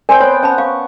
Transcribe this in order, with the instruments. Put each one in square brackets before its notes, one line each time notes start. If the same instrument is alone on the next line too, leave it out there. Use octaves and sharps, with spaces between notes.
[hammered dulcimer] C4 C5 G5 [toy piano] A#4 D5 G#5
[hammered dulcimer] B3 C4 [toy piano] C#5
[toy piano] C#4 A5 B5 [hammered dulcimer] F#5
[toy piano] F5 [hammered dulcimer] C#6